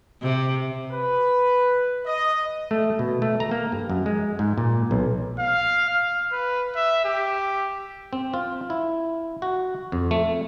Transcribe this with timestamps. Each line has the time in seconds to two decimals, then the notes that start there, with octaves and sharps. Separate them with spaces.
0.22 C3
0.91 B4
2.06 D#5
2.71 A3
2.99 B2
3.22 A3
3.40 A#5
3.51 A#3
3.72 G2
3.90 F#2
4.06 G#3
4.39 G#2
4.58 A#2
4.91 B1
5.39 F5
5.89 F6
6.32 B4
6.76 E5
7.05 G4
8.13 C4
8.34 F4
8.70 E4
9.42 F#4
9.92 F2
10.11 A3